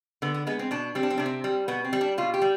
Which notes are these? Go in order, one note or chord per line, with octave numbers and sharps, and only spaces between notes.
D3 B3
B3
G#3 B3
C4
B2 D4
G3 C4
D4
C4
C3 D4
C4
G3
B2 B3
C4
G3
D4
B2 F4
G4
G3